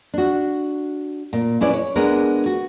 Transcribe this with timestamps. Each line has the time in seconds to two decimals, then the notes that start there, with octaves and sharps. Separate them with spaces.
0.14 D4 F#4
1.33 A#2
1.61 C#4 E4 B4 D5
1.73 C#5
1.96 G#3 B3 D4 A#4
2.46 F#4